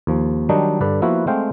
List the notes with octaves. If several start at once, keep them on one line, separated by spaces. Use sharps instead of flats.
D#2 F3
D#3 F#3 G3 D4 D#4
G2 D3 B4 D5
F3 A#3 B3 E4 F#4 B4
G#3 A3 C4 F5 G5